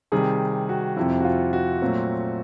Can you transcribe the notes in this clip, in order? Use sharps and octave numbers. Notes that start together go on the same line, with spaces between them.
C3 D#3 G3 G#4
F#4
F2 C3 F3 E4
F#4
F4
F#4
A#2 F#3 A3 C4